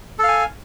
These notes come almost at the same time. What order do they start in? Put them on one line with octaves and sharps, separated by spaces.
A4 F5 G#5